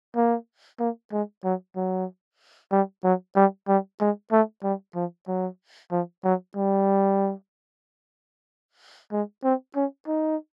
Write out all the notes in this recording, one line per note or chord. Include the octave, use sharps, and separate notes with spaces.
A#3
A#3
G#3
F#3
F#3
G3
F#3
G3
G3
G#3
A3
G3
F3
F#3
F3
F#3
G3
G#3
C4
C#4
D#4